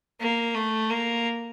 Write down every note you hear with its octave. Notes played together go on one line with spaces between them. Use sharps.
A#3
A3
A#3